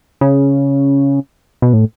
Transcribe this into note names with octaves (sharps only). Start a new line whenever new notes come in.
C#3
B2
A2